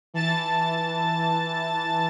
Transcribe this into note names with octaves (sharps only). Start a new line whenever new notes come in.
E3 A5 A6